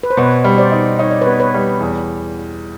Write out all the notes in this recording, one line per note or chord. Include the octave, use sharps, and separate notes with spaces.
B4
C5
B2 B4 C#5
G3
C5 D5
D#4
D#4 C#5
D5
B4 C#5
B3
B4 C#5
G3
E2